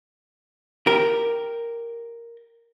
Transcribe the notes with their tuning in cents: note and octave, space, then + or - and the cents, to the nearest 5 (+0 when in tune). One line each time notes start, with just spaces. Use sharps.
G4 +0 A#4 +0